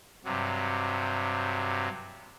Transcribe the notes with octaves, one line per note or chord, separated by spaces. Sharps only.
G2 C3 F#3